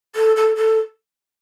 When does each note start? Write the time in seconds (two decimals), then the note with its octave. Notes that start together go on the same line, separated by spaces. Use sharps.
0.16 A4
0.36 A4
0.56 A4